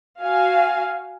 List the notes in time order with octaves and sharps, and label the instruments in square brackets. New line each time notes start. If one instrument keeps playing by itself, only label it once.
[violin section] F#4 F5 G#5